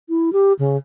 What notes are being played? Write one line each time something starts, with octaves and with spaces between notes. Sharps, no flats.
E4
G4
C#3